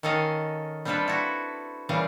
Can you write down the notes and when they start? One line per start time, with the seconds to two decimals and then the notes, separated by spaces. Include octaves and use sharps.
0.03 D#3 C#4 A4 D#5 F5
0.85 G3 C4 D4 F4 A4 B4
1.08 E4 F#4
1.89 A#2 C#3 E3 G3 F5